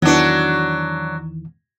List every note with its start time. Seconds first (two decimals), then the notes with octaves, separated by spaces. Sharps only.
0.02 E2 D#3 E3 F#3 D4